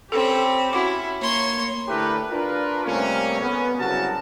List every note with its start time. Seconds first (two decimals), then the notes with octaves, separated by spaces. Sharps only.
0.12 C4 C#4 G4 A4 B5
0.73 C#4 E4 F#4 F#5 D6
1.21 A#3 C#5 C6
1.88 D3 A3 E4 G4 A#4 B4
2.30 D4 F4 A#4 B4
2.84 C3 G3 A3 A#3 C#4
3.40 B3 C#4
3.78 C2 F#2 C#3 F#4 A#4 A5